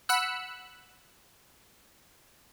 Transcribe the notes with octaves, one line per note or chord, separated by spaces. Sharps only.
F#5 B5 E6 F#6